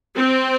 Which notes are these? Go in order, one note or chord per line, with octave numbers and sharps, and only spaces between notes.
C4